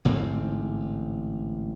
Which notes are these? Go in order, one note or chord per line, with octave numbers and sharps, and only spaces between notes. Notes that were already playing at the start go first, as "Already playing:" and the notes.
A1 G#2 D3 C4